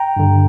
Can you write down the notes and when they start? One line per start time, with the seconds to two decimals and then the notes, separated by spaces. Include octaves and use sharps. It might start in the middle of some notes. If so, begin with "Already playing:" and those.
Already playing: G5 A#5
0.16 G2 D3